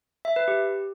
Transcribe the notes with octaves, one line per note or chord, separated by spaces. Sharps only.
E5
B4
G4